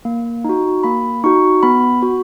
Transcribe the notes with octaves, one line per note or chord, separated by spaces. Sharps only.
A#3
D#4 F#4
A#3 B5
D#4 F#4 C#6
B3 B5
F#4